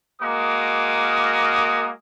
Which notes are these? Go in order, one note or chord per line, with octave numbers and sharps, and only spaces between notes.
G#3 A#3 F#4 A#4 D6 D#6